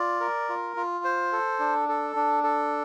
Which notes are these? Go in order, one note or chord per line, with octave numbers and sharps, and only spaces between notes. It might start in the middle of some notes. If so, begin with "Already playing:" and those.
Already playing: F4 D5
A#4
F4
F4
C5
A4
D4
A4
D4
A4